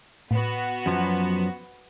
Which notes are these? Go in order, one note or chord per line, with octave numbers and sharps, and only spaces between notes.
A2 B3 F#4
F#2 F3 F#3